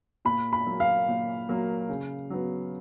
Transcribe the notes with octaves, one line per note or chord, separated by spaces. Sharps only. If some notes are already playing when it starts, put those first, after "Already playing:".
A#2 B5
B5
F#3 A#3
F5
A#2
F#3 A#3
C#3
F#3 B3